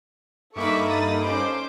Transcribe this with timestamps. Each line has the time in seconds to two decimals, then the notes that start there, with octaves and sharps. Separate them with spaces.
0.56 G2 A#3 D#4 A4 E5 B5 C#6 D6
0.89 D#6 A6
1.22 C#4 C5 D6